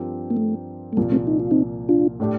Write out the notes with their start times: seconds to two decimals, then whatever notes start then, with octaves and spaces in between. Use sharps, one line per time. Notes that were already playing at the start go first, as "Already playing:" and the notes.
Already playing: G2 F3 C4 G4 A#4
0.30 A#3
0.37 A3
0.93 A3
0.97 C2 A#2 F3 G3 A#3
1.12 A3 C4
1.27 D#4
1.39 F4
1.51 C4 D#4
1.89 D4 F4
2.20 A2 A3 D4 G4